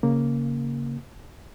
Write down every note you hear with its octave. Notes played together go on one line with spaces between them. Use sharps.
C#3 A#3